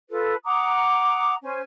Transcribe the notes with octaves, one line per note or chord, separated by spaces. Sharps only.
F4 A4 B4
F#5 A#5 D6 D#6
C#4 C5 G#5